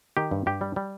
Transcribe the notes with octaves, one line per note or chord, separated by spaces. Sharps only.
D#3 G4
G2
G2 G4
G3
G3